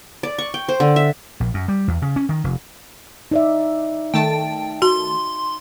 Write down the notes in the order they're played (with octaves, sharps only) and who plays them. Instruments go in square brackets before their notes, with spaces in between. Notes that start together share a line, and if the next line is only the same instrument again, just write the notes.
[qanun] D5
C#6
G5
C5
D3
E5
[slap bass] A#1
F#2
G3
E2
C#3
C#4
D#3
F1
[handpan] D#4 D5 E5
[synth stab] D#3 A3 A5 [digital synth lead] G5
[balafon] F#4 [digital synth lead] C6